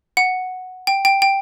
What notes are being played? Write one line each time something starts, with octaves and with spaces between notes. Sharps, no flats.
F#5
G5
G5
G5